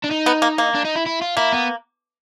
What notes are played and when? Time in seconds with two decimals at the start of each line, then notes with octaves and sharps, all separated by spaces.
0.04 D4
0.11 D#4
0.26 B3
0.42 A#3
0.58 A#3
0.74 D4
0.84 D#4
0.95 E4
1.06 E4
1.21 F4
1.37 A#3 E4
1.53 B3